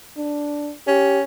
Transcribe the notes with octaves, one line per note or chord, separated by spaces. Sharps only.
D4
C#4 G4